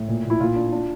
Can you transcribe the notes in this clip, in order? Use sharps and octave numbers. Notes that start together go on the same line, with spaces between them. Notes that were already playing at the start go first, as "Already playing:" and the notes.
Already playing: A2
A#2
A#2
E4
A#2 F4
D4
D4